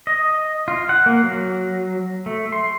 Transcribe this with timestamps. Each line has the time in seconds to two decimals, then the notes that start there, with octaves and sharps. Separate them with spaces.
0.07 D#5
0.68 F4
0.89 F#5
1.06 A#3
1.24 F#3
2.26 A3
2.52 C6